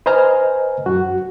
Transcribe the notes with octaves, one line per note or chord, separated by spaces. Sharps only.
B4 C5 D#5 G#5 A#5 F6
F#2 F#4